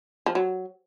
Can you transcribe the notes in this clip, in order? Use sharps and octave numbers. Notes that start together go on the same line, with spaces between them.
F3
F#3